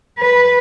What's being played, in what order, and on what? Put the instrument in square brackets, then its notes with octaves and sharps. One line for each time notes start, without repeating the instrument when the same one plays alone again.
[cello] B4